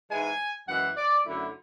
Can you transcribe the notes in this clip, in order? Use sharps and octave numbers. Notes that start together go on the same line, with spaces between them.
G#2 E3 G#3 G#5
F#2 E3 G#3 F#5
D5
F#2 D3 F#3 A3 E4